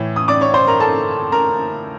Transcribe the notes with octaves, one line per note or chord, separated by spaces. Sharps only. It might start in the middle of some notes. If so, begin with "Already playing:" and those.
Already playing: A2 E3 C#5
D#6
D5 D6
C#5 C#6
C5 C6
A#4 A#5
A4 A5
A#4 A#5